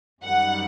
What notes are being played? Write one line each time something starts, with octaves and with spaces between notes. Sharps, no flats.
F#2 D#3 G3 F#5